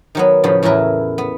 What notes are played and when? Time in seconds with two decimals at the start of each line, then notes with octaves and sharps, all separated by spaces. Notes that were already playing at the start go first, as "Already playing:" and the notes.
0.15 D#3 F#3 B3
0.43 A2 C#3 F3 B3
0.63 E2 A2 E4 A#4 B4
1.18 B3